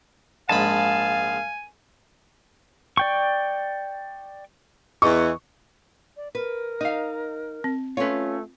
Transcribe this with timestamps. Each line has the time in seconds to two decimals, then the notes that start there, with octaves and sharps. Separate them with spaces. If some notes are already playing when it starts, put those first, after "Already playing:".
0.49 A#1 G#2 F5 G#5 A5 B5
2.97 D5 G5 C#6
5.02 E2 E3 D#5 C#6
6.17 D5
6.35 A#4 B4
6.81 D#4 D#5 F5
7.64 C4
7.97 A3 C#4 F4 B4 C#5